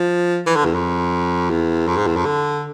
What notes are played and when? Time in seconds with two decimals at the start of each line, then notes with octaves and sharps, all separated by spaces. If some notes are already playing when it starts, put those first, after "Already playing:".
Already playing: F3
0.46 E3
0.56 D3
0.65 E2
0.74 F2
1.50 E2
1.87 F2
1.97 G#2
2.07 E2
2.16 F2
2.25 D3